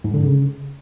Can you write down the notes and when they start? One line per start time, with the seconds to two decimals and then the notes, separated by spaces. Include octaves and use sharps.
0.04 G#2
0.14 D3
0.23 C#3